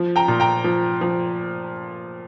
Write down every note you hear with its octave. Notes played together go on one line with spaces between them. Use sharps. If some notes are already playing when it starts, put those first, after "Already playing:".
Already playing: F3
G5 A#5
A#2
G5 A#5
F3
F3